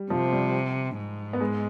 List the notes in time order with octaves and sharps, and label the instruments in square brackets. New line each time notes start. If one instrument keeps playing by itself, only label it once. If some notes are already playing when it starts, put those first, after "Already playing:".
Already playing: [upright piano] G3
[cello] C3 [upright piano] F3
[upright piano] G3
[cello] G#2
[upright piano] B3
G#3